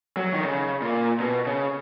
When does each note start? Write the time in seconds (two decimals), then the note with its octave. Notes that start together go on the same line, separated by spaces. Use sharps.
0.17 F#3
0.34 D#3
0.43 C#3
0.82 A#2
1.20 B2
1.46 C#3